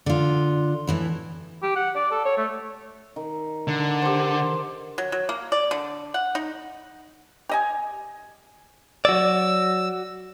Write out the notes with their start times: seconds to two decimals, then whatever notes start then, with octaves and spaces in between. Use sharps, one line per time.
0.06 D3 F4
0.87 A2 E3 E4
1.63 G4
1.76 F#5
1.95 D5
2.11 A4
2.25 C#5
2.37 A3
3.16 D#3
3.68 D3
4.02 G4 C5
4.98 F#3
5.12 F#3
5.29 A#3
5.52 D5
5.71 D3
6.14 F#5
6.35 D#4
7.49 G4 D#5 G#5
9.05 F#3 F#4 D5 E6